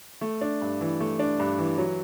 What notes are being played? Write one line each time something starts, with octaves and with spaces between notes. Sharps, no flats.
A3
D4
G2
E3
A3
D4
G2
E3
F#3